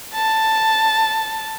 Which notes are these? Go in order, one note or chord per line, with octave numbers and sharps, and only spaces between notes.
A5